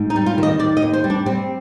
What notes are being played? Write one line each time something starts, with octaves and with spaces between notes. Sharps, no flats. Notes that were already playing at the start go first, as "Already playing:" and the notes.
Already playing: G#2
D#4
G3
F4
D#3
D#5
D#3 D5
D#5
D#2
C5
G3
D4
G3 C4